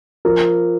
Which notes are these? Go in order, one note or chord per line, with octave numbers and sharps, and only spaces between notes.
F3 A#4